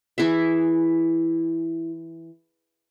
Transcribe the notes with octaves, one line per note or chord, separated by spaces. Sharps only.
E3 E4 G#4 E5